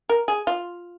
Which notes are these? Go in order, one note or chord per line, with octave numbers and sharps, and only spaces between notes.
A#4
G#4
F4